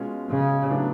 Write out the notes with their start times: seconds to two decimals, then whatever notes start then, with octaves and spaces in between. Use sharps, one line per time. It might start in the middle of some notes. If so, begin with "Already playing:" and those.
Already playing: B2 G#3 C#4 F4
0.30 C#3
0.69 A2 F#3 B3 D4